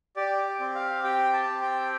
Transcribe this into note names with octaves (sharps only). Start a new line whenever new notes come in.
G4 D5
C4
F5
G4 G5
A5
C4
G5